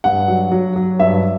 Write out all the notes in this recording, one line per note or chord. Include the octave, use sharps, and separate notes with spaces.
G2 F#5
F#3
F#3
F#3
G2 E5